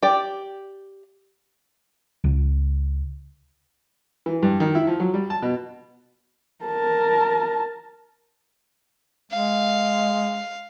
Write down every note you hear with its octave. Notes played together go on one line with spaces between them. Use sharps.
G4 D5
C#2
E3
G2
D#3
E4
F3
F#3
G3
A5
B2
A#4 A5
G#3 F5